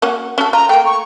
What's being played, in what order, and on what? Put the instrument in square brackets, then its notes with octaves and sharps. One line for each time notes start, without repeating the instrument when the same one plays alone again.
[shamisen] A#3 C#4 F#4
C#4 F#4 A4
[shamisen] F4 [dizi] A#5
[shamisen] A3 A#3 [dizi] G5
[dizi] C#6